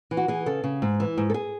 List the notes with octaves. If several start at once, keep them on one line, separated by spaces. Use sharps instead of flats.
E3
F#4
E3 G#4
C#3 A4
C#3
G#2
E3
G#2
A4
G#4